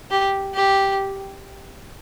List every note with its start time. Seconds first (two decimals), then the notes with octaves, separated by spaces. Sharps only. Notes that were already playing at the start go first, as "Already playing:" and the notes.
0.11 G4
0.54 G4